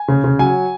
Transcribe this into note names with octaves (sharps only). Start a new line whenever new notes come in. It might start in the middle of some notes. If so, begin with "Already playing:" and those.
Already playing: G#5
C#3
C#3
F#3 G#5